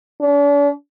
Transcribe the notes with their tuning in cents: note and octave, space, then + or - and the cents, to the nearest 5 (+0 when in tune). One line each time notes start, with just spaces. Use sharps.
D4 -45